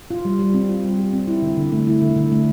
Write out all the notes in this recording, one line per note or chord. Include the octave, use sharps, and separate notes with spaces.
F4
G3
G3
C4
F4
G3
G3
C4
E4
D3
D3
A3
E4
D3
D3
A3